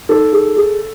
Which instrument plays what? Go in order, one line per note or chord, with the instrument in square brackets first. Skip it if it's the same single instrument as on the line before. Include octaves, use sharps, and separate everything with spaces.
[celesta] D#4 [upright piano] A4
[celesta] G#4
G#4